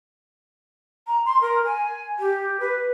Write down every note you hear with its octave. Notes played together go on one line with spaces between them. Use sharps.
A#5
C6
A#4
G#5
G4
B4